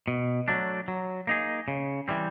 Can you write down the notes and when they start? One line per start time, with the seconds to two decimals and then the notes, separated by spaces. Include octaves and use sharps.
0.08 B2
0.48 F#3 A3 D4
0.88 F#3
1.27 A#3 D#4 G#4
1.68 C#3
2.08 E3 G3 C4